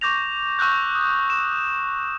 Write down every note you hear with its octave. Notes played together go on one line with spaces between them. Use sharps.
C#6 D6 G6 A#6 F7
C#6 E6 F#6 G6
D#6
E7